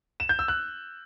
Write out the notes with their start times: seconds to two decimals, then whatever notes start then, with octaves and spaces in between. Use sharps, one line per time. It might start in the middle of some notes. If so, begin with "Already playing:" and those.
0.20 E7
0.29 G6
0.39 E6
0.48 F#6